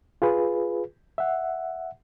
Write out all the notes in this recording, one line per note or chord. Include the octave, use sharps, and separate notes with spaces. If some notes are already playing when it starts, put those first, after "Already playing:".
F4 G#4 B4
E5 F#5